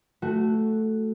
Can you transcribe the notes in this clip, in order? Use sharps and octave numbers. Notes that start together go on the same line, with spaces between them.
A3 F#4